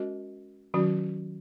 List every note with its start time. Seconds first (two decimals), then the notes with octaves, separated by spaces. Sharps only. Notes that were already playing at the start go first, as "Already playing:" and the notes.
Already playing: G#3 C#4 F#4 A#4 D#5
0.74 D#3 F#3 C#4 F#4